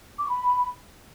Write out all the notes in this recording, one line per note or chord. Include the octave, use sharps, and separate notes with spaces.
D6
C#6
B5